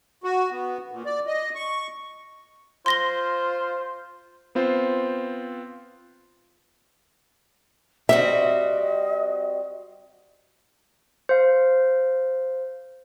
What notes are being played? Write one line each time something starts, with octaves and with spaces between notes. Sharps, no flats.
F#4
B3
A#2
D5
D#5
C#6
F4 C5 C6 A#6 G7
B3 C4 F4 C5
G3 C4 F#4 D#5 E5
C5 F5